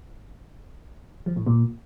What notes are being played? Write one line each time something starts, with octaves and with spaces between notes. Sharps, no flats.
F3
A2
A#2